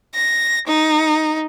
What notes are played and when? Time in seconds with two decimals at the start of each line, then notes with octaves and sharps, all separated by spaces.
0.15 A#6
0.67 D#4